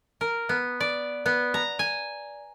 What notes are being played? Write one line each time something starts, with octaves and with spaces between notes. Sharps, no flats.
A#4
B3
D5
B3
A#5
G#5